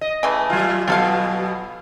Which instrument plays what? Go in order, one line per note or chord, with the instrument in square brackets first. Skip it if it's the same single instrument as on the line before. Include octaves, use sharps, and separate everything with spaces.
[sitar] D#5
[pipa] C#3 E3 A3
[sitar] F#3 F4
[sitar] B2 F#3 B3 [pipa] F4 A4 F5